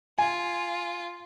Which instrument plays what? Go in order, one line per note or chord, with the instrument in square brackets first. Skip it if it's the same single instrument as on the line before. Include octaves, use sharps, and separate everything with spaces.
[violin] F4 [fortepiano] G#5